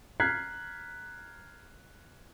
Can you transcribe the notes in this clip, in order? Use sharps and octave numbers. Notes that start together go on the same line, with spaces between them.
A#5 F6 F#6 G#6 B6 C7